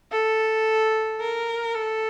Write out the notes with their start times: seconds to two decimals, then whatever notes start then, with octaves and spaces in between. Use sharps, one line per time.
0.12 A4
1.20 A#4
1.75 A4